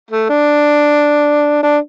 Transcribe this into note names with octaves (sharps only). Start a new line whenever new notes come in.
A3
D4
D4